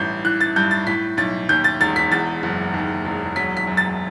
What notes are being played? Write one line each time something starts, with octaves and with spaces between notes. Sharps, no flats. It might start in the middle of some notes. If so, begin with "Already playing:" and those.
Already playing: A1 G2 G6
E3 F#6
A6
G2 G6
A6
A2 B6
B1 A6
D#2 G6
A6
E1 A6
B6
E2 A6
F#1
D#2
E1
F#3 B6
B6
F#2
A6